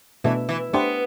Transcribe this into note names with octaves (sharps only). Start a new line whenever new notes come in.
B2 E3 A3 D4
E3
A3 B3 D4 G4 C5